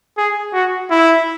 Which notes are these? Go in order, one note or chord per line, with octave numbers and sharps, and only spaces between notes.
G#4
F#4
E4